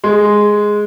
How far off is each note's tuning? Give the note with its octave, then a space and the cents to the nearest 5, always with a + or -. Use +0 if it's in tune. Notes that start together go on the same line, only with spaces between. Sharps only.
G#3 +0